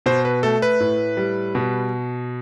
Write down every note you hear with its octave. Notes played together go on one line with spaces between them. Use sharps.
B2 C5
B4
A3 A4
B4
A2
G3
B2